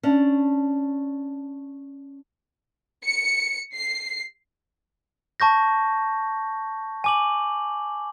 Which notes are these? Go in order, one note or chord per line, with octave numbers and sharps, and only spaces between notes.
C#4 D4
C#7
C7
A5 C#6 G6 A#6
G#5 D6 F#7